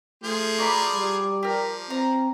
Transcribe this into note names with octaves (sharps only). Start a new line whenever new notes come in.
F3 A3 G#4 C6
F#4 D5 A#5 B5 D6
G3
F3 G4 A#4
C4 A#5